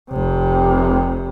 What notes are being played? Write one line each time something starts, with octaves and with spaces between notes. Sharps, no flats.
F1 C3